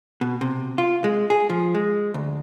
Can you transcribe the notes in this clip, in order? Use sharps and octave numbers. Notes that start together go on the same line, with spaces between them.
B2
C3
F4
G#3
G#4
F3
G#3
D2